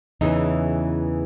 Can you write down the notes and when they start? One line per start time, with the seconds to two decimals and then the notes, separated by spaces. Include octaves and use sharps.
0.21 E2 C#3 E3 D#4